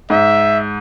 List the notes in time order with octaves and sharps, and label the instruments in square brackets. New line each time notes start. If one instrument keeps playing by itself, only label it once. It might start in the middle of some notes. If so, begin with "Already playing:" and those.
[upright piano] G#2 [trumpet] E5